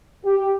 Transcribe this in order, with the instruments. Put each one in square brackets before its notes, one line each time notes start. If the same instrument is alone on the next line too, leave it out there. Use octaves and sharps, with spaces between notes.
[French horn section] G4